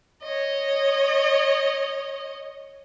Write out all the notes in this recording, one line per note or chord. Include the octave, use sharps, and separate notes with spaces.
C#5 D#5